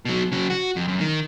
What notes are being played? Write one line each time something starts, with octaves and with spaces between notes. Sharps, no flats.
B2 F#3
C#3 F#3
F#4
F2
F#2
D#3